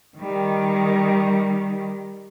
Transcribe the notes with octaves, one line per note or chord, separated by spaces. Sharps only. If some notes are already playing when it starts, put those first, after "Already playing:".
D#3 G3